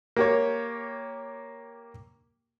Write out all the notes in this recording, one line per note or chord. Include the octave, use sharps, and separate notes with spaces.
A#3 G4 C#5